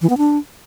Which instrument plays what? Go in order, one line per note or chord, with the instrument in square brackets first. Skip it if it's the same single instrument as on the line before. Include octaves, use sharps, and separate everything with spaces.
[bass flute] E3
B3
D4